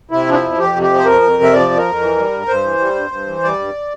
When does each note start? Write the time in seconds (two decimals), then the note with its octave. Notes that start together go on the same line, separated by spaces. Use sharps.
0.11 C3 E4
0.27 F3 D4
0.34 E4
0.42 F2
0.58 F2 G4
0.74 C3
0.83 G4
0.90 F3
0.98 C5
1.05 F2 A#4
1.22 F2
1.37 C3
1.43 E5
1.53 F3 D5
1.70 F2
1.77 A#4
1.85 F2
2.00 E3
2.16 G3
2.32 G2
2.48 G2 C5
2.63 E3
2.80 G3
2.95 G2
3.11 G2
3.27 E3
3.44 G3 D5
3.59 G2